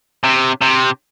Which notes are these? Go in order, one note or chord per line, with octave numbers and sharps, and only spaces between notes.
C3
C3